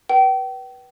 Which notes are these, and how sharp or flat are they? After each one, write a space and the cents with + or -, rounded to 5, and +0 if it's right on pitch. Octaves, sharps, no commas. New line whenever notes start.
B4 -20 G5 -35